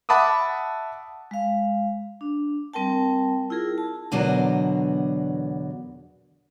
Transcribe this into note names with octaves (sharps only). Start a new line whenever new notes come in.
E5 F#5 A5 B5 D6 D#6
G#3 F5
D4
G3 C4 A#4 G5 A5
E4 F4 G#4 A#4
A5
E2 B2 D3 F#3 A#4 G#5